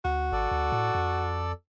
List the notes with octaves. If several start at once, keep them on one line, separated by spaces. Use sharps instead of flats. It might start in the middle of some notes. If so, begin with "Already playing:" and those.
D2 F#4
G#1 A4 D5
D2
A2
F2